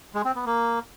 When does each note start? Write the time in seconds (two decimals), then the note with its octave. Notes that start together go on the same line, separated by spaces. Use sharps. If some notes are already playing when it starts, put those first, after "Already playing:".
0.15 G#3
0.25 C4
0.36 B3
0.46 A#3